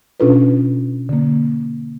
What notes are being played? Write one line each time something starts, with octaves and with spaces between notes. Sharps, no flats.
B2 C#4 D4 F4 A4 B4
D3 A#3